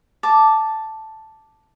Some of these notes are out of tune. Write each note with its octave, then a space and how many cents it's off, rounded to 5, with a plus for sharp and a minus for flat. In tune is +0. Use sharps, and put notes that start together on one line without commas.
A5 +0 D6 +0